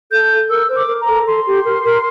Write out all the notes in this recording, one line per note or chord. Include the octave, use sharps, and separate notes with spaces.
A4 G6
A#4 E6
C5
D6
A#4
A#5
A4
A4 C6
G4
A#4
A#4